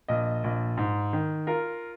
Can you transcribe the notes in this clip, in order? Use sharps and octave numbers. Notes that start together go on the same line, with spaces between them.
A#1 D#5
A#1
G#2
D#3
F4 A#4